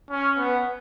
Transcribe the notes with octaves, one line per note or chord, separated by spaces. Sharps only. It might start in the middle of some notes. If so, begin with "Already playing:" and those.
C#4
B3